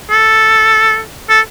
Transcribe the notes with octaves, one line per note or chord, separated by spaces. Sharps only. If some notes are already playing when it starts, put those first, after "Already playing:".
A4
A4